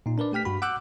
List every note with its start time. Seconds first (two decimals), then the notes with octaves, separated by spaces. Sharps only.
0.06 A#2 D#4
0.18 D4 A#4 B4 D5
0.32 A3 G4 G5 F6 B6
0.45 G2 F#4 B5
0.62 F#5 D6 E6 F#6 G6